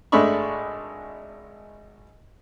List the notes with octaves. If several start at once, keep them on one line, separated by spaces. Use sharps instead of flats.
G#1 G#3 A3 D4 B5 C#6